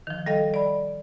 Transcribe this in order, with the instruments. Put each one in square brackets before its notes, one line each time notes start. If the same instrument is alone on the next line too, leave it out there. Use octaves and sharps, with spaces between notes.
[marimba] D#3 F3
G3 A4 D#5 F5
D5 B5